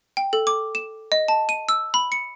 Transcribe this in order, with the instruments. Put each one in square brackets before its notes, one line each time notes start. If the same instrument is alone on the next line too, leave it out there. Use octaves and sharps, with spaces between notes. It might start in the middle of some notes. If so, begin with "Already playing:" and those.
[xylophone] G5
A4
D6
E7
D#5
A5
D#7
E6
B5
C#7